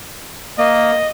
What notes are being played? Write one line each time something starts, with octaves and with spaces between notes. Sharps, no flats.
A#3 D#5